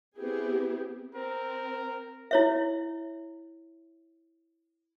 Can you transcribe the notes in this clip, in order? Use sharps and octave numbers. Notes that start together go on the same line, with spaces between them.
B3 C4 E4 G4 G#4
C4 A#4
E4 C#5 E5